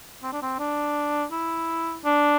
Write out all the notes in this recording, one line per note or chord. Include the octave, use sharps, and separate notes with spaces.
C4
D4
C4
D4
E4
D4